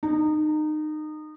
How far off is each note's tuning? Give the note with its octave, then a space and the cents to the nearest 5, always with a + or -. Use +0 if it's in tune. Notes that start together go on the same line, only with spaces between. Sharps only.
D#4 -25